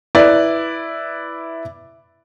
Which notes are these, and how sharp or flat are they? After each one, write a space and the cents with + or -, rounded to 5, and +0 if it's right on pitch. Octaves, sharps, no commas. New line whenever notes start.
E4 +0 B4 +0 D5 +0